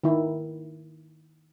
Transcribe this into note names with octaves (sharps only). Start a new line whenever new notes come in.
D#3 E4